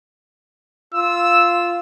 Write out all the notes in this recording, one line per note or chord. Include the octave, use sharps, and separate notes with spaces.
F4 E6